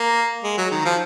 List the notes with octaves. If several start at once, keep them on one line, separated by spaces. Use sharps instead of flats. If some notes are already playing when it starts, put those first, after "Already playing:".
Already playing: A#3
G#3
F#3
D#3
F3